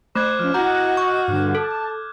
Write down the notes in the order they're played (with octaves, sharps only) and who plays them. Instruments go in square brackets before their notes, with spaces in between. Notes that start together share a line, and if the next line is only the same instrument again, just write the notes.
[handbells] A3 [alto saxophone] C5 [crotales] D6 F#6 G#6
[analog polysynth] F3 C#4 [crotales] F6
[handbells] E4 A#5 [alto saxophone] F#4 [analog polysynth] D#5 F#5 [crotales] G6
[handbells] C#6
[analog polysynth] G2 D3
[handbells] A4 [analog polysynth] A5